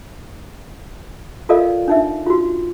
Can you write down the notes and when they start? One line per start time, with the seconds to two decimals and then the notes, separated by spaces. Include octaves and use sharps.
1.49 F4 A4 A#4 D5 D#5 F5
1.88 D4 D#4 E5
2.26 F4 F#4